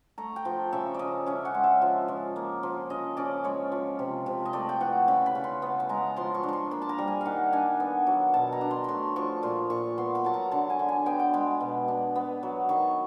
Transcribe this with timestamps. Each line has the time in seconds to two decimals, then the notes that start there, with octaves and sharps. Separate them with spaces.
0.18 A3 A#5
0.36 G5
0.45 F3
0.73 C#3 E5
0.94 C#4 D5 D#5
1.26 C#4 E5
1.45 F#5
1.54 G#3
1.64 E5
1.82 F3
2.08 F3
2.36 A#3
2.63 F3
2.90 C#3 D#5
3.17 C#4 D5
3.44 G#3 C#5
3.72 F3
3.99 C3
4.26 C3
4.46 D#5
4.53 A3 D5
4.69 G5
4.80 E3 F#5
5.08 C#3 B5
5.26 B5
5.35 C#3
5.44 C6
5.62 B3
5.80 B5
5.89 G#3 A#5
6.16 F3 C6
6.35 C#6
6.43 D4
6.49 C6 C#6
6.71 A#3 B5
6.82 A5
6.89 A#5
6.98 G3
7.08 G#5
7.21 D#3 F5 F#5
7.52 D4 G#5
7.80 B3
8.07 F#3
8.34 B2 A5
8.53 A#5
8.61 D4
8.71 C6
8.84 A3 B5 C6
9.16 F3 C#6
9.43 A#2 C6
9.70 A#2 C#6
9.98 B3 C6
10.15 B5
10.25 F#3 A5
10.34 A#5
10.52 D3 A5
10.70 G#5
10.79 D3
10.89 G#5
11.06 B3 G5
11.20 G5
11.34 G#3 B5
11.61 B2
11.88 D4
12.15 B3
12.43 F#3
12.69 D#3 C#6